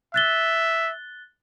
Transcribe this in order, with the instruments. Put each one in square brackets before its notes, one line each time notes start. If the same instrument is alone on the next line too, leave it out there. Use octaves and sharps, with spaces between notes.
[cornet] E5 [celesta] F#6 A6 G7